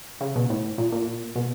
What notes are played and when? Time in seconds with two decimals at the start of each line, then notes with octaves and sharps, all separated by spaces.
0.21 C#3
0.36 B2
0.50 A2
0.78 A#2
0.92 A#2
1.36 B2